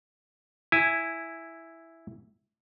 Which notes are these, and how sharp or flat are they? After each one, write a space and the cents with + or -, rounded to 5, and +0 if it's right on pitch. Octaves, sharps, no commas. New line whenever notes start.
E4 +0 G#5 +0